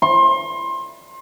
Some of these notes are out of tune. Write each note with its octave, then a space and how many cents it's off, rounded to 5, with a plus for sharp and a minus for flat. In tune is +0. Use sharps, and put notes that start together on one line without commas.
C6 +30